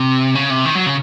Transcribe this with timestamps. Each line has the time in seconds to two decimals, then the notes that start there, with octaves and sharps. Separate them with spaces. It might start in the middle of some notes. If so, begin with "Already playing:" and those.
Already playing: C3
0.35 C#3
0.50 C3
0.65 D#3
0.75 F#3
0.86 C#3